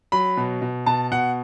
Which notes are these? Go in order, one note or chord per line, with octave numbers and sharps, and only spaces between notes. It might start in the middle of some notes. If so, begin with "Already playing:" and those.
F#3 B5
B2
B2
B2 A5
B2 F#5